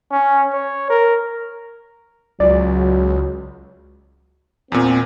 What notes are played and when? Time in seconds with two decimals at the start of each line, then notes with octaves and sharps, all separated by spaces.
0.11 C#4
0.53 C#5
0.90 A#4
2.40 C#2 F#3 D5
4.72 E2 A#2 C4